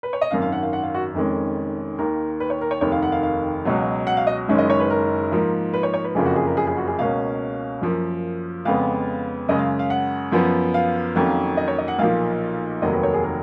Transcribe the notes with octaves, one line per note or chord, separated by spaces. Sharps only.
B4
C#5
D#5
G#1 F#2 D#3 F5
F5
F#5
F5
F#5
F5
F#4
F1 F2 D#3 G#3 C#4
D#2 D#3 A#3 A#4
B4
C#5
A#4
C#5
F1 D#2 D#3 C#5
F5
F#5
F5
F5
C#2 B2 F#3
F#5
F5
D#5
F#1 F#2 D#3 G#3 C#4
D#5
C#5
B4
A#4
G#2 F3 A#3
B4
C#5
C#5
B4
F#1 F2 C#3 F3 A#3 G#4
F#4
G#4
A#4
G#4
G#4
F#4
G#4
C#2 B2 A#3 C#4 F5
F#2 F3 A#3
F2 C#3 G#3 B3 F5
F#2 C#3 G#3 D#5
F5
F5
F#5
F#2 F3 B3
F5
F2 D#3 F#3 A#3 C#4
D#5
C#5
D#5
F#5
B1 A#2 F3 F5
F1 D#2 D#3 F#3 A#3 D#5
B4
C#5
G#4
A#4